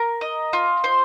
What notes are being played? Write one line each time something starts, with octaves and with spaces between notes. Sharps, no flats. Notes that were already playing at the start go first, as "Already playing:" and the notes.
Already playing: A#4
D#5
F4
C5